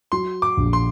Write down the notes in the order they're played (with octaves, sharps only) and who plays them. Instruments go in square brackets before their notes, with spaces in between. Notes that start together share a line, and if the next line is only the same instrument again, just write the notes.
[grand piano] F#3 [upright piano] C6
[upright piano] D6
[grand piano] A#1
[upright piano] C6